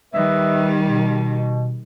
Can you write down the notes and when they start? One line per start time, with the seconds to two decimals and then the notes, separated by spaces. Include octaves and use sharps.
0.14 D#3 G3 B4 D#5 E5
0.83 B2